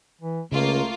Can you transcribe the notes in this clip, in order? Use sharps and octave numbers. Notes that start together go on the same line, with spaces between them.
E3
C#2 C#3 A3 A#3 F4